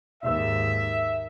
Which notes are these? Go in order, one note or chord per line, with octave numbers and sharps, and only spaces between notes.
D#2 G#2 E5